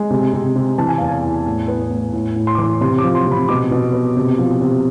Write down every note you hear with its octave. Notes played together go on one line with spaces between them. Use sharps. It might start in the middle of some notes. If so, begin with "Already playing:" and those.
Already playing: G#3
C3
C3
C3
E3 A5
G#5
E2 F5
G#5
E2
A2
B3
A2
A2
A2
C6
D6
E3 C6
C3 C6
D6
F3
C6
C3
B5
B2 D6
B2
B3
C3
F3
C3